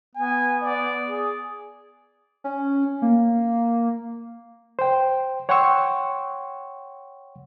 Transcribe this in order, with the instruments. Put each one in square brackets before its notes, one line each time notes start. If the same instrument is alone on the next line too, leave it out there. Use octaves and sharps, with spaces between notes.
[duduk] B3 [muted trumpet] G#5
[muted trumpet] D5
[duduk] G#4
[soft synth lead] C#4
A#3
[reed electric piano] C5 G5
C#5 F#5 G5 C6 C#6 E6